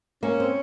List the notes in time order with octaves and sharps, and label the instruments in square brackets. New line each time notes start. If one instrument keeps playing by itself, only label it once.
[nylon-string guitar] A#3 [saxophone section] C#4
[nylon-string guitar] C4